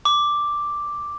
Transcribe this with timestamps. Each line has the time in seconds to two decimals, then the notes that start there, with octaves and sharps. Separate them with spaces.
0.05 D6